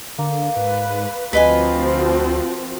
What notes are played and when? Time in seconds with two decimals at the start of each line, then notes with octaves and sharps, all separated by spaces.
0.18 D3 A#3
0.57 G#2 B4
1.33 D2 F3 C4 F#4 B4 D#5 G#5